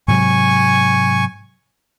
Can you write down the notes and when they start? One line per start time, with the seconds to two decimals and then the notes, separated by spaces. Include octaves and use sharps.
0.08 G#2 C3 F#3 G#5 C#6